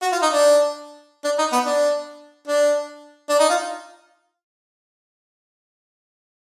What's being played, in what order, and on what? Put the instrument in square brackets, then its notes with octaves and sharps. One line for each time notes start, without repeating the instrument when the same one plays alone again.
[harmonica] F#4
F4
D#4
D4
D4
D#4
B3
D4
D4
D4
D#4
F4